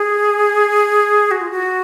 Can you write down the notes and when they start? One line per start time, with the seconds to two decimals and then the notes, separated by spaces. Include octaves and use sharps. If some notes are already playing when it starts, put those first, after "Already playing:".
Already playing: G#4
1.31 F#4
1.41 F4
1.51 F#4